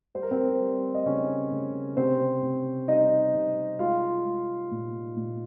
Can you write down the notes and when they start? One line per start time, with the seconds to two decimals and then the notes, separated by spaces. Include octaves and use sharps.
0.14 G3 C5
0.23 A#4
0.31 C4 C5
0.60 G3
0.95 D#5
1.06 C#3 C#4 C#5
1.51 C#3
1.96 C3 C4 C5
2.42 C3
2.88 G3 D#4 D#5
3.34 C3
3.79 G#3 F4 F5
4.24 G#3
4.71 A#2
5.16 A#2